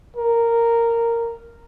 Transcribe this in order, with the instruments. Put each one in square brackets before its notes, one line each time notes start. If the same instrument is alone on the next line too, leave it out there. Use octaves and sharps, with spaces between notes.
[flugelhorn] A#4